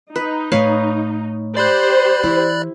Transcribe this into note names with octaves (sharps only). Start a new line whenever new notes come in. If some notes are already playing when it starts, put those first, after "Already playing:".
D#4 B4
A2 B4 C#5 F5
G4 C5 D5 B5 F#6
E3 E4